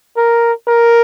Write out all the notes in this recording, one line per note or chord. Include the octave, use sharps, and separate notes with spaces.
A#4
A#4